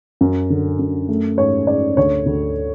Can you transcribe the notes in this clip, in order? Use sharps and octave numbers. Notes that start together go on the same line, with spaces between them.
F#2
D3
F#2
A3
G#2 C#5
G#2 D5
D2 C#5
D2